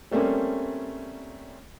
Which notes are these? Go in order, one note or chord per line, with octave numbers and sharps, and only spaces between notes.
G3 A3 A#3 C4 C#4